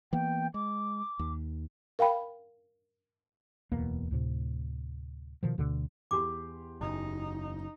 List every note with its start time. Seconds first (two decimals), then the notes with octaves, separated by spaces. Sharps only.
0.13 E3 A#3 B3 G5
0.54 G#3 D6
1.19 D#2
1.99 A#4 F5 G5 B5
3.72 D1 E2 B2 A#3
4.11 D2 A2 C3
5.43 B2 D#3 F3
5.58 D2 B2 D3
6.11 E2 G4 C6 D6
6.81 F#1 D#4